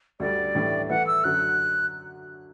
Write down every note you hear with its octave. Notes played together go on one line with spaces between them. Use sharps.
D2 D3 G3 D5
A2 E3 G3 D4 A4
E3 A3 E4 B4 F#5
E6
F#2 D3 F#3 F#6